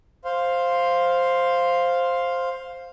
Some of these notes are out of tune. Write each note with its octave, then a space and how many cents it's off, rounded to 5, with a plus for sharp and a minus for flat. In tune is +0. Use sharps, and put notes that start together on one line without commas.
C5 +5 F5 +0